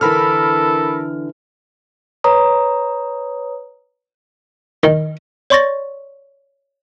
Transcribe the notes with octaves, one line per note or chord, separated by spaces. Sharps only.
D3 E3 A4 A#4 B5 F6
B4 C#5 A#5 D#6
D#3
C#5 D5 C6 C#6 A6 A#6